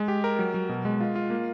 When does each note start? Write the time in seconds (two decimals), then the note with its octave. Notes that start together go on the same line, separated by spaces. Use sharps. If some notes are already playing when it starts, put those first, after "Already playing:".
Already playing: G#3
0.08 G4
0.24 A#4
0.39 F#3
0.54 F#3
0.69 B2
0.85 G#3
1.01 F4
1.15 F4
1.30 A#3